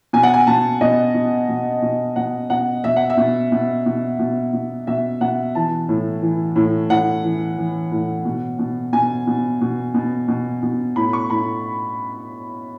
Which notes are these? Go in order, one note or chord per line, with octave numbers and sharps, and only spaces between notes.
B2 G#5
F#5
G#5
B2 A5
B2 D#5
B2
B2
B2
B2 F#5
B2 F#5
B2 E5
F#5
E5
B2
B2
B2
B2
B2
B2 E5
B2 F#5
E3 A5
A2
E3
A2
A2 F#5
E3
E3
A2
B2
B2
B2 G#5
B2
B2
B2
B2
B2
A2 B5
C#6
A2 B5